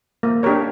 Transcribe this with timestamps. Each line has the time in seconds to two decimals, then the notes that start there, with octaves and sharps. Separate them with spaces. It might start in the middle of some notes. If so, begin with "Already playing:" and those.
0.23 A#3
0.43 D4 G4 A#4 C#5